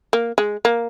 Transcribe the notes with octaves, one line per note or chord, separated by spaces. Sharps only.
A#3
G#3
A#3